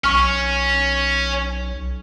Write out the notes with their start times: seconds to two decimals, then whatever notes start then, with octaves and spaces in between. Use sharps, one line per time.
0.04 B1 C#4 C#6 F6